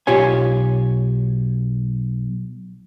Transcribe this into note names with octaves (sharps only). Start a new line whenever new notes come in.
B1 F4 G4 C#5 G#5